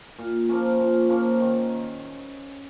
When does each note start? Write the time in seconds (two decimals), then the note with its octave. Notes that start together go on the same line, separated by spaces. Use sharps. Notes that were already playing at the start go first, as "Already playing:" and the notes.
0.18 A#2
0.49 F3 A#3 C#4
0.80 A#2
1.09 F3 A#3 C#4
1.40 D#3